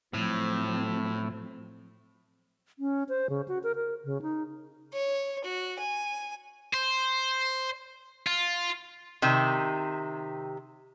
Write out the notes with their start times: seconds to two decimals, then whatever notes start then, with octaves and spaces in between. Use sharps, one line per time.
0.14 A2 F3 F#3 C4
2.79 C#4
3.09 C5
3.30 C#3
3.48 F#4
3.63 A#4
3.75 A#4
4.05 C#3
4.22 D#4
4.93 C#5
5.44 F#4
5.80 G#5
6.73 C5
8.26 F4
9.22 C3 D#3